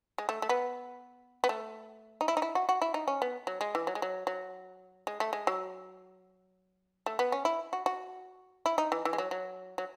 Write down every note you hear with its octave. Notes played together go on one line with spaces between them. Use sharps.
G#3
A3
A3
B3
B3
A3
D#4
E4
D#4
E4
F#4
F#4
E4
D#4
C#4
B3
F#3
G#3
E3
F#3
G#3
F#3
F#3
G#3
A3
G#3
F#3
A3
B3
C#4
E4
F#4
F#4
E4
D#4
E3
E3
G#3
F#3
F#3
F#3